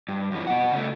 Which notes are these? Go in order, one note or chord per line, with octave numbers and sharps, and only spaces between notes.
G2
F#2 E3
B2 F#5
C#3 A3